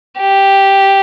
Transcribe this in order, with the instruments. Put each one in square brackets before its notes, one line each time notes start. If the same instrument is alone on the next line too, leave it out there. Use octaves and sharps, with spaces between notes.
[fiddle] G4